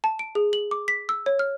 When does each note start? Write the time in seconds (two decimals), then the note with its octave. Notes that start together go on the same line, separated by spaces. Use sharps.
0.04 A5
0.19 D7
0.35 G#4
0.53 F#7
0.71 D6
0.88 B6
1.09 E6
1.26 C#5
1.39 F6